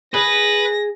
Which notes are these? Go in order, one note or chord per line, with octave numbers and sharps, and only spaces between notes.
G#4 B4 A#6